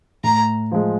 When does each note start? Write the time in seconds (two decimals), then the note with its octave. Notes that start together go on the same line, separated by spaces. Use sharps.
0.24 A2 A#5
0.72 F3 G#3